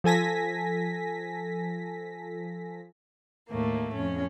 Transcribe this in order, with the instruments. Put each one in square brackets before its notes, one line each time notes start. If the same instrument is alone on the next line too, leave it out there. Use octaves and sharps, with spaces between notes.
[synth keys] F3 A4 G#5 A#6 B6
[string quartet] D#2 A2 A3 A#3
F2 C#4